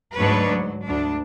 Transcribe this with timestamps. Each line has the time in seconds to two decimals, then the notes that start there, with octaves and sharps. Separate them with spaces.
0.17 D2 G#2 F#3 D4 B4 C#5
0.50 F#3
0.85 D2 D4